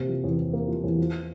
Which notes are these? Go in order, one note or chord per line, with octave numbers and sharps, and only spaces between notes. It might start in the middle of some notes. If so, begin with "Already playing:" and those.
Already playing: C3 A#3
F3
E2
E2
A#3
F3
E2
F3